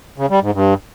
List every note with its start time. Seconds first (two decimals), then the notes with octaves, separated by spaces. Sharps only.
0.18 C#3
0.30 G3
0.42 G#2
0.54 G2